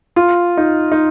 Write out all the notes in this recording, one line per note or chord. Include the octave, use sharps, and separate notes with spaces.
F4
D#4
D#4